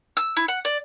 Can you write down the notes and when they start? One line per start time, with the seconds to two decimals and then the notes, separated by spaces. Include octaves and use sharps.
0.17 E6
0.37 E4
0.48 F#5
0.65 D5